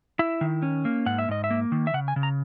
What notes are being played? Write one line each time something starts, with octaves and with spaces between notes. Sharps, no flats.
E4 E5
D#3
C#4
A#3
G#2 F#5
E5
G#2 D#5
E5
A#3
D#3
E5
C#3 F#5
G#5
C#3
A#5